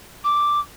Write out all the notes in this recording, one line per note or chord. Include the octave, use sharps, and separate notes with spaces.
D6